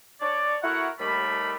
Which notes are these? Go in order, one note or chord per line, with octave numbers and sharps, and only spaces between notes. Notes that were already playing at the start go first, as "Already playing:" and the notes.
D4 C#5 D5
A3 E4 F#4 A#4 C#5 F#5
D#2 G3 A3 B5